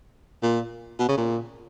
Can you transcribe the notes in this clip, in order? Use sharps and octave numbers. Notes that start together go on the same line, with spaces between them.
A#2
B2
C#3
A#2